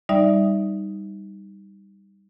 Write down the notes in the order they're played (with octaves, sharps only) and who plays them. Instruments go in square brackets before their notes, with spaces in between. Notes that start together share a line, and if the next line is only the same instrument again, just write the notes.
[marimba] G3 D#4 D5 E5